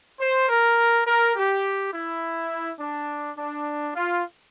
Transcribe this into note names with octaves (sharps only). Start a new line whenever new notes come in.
C5
A#4
A#4
G4
E4
D4
D4
F4